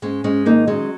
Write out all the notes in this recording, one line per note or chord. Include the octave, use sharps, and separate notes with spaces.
G#2 G#3 C#4
G#2 G#3 C#4
D#3 A#3 D#4
F#3 G#3 C#4